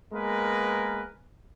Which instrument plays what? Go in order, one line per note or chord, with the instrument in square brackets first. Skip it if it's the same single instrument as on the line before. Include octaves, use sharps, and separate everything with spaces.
[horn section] G#3 A#3 B3 A#4 B4